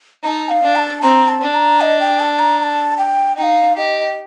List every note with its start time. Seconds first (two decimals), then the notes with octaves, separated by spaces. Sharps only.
0.24 D#4 A#5
0.27 A5
0.49 F5
0.63 D4
0.75 A#5
0.79 A5
1.02 C4 A#5
1.28 A5
1.41 D4
1.54 A#5
1.81 D#5
2.00 G5
2.20 A5
2.39 A#5
2.59 A#5
2.63 A5
2.98 G5
3.37 D#4 G5
3.42 F5
3.77 G4 D#5